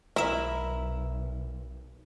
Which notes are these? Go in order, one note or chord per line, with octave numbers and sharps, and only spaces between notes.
B1 E4 A#4 E5